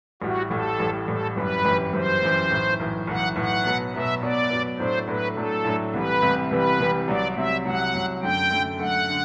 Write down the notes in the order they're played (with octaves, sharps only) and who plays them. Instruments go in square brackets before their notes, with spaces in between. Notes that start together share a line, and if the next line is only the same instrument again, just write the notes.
[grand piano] A1 A2 G3 [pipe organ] F#4
[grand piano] A1 A2 G3 [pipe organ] A4
[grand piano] A1 A2 G3
[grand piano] A1 A2 G3 [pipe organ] A4
[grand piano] G1 F#2 E3 G3 [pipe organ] B4
[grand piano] G1 F#2 E3 G3
[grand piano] G1 F#2 E3 G3 [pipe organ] C5
[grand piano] G1 F#2 E3 G3
B1 A2 E3
B1 A2 E3
[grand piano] B1 A2 E3 [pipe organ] F#5
[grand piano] B1 A2 E3 [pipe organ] F#5
[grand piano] B2 F#3 B3
[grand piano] B2 F#3 B3 [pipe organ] E5
[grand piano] B2 F#3 B3 [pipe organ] D5
[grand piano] B2 F#3 B3
[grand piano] A2 F#3 A3 D4 [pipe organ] C5
[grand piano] A2 F#3 A3 D4 [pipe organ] B4
[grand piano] A2 F#3 A3 D4 [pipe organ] A4
[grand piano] A2 F#3 A3 D4
[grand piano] C2 C3 E3 G3 [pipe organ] B4
[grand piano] C2 C3 E3 G3
[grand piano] C2 C3 E3 G3 [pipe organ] B4
[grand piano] C2 C3 E3 G3
[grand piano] C2 C3 F#3 [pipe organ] D5
[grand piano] C2 C3 F#3 [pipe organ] E5
[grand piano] C2 C3 F#3 [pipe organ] F#5
[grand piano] C2 C3 F#3
[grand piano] F#2 D3 A3 [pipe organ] G5
[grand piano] F#2 D3 A3
[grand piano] F#2 D3 A3 [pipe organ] F#5
[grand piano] D3